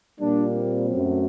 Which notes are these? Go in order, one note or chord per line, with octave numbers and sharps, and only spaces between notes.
A#2 G3 A#3 D4
C4
F#2 F#3 A3